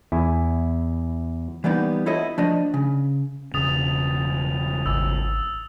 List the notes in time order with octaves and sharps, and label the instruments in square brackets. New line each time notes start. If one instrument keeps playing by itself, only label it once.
[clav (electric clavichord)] E2 E4 G#5
[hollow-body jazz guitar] E3 G3 A#3 B3 D#4
E4 F4 A4 C#5 D#5
F3 A3 D4 D#5
C#3
[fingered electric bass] E1 C#3 [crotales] D#6 A6 F7
[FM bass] G#1 [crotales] E6